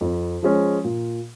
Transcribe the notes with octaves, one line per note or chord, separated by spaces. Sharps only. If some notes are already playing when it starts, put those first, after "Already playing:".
F2
F3 G#3 C#4
A#2